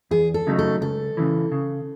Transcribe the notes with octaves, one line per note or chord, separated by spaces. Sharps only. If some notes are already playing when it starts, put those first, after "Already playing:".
E2 G#4
A4
C#3 F#3 A3 D#4
A4
C#2 A4
C#3 E3
C#3